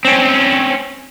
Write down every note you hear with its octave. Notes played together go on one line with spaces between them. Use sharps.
C4 C#4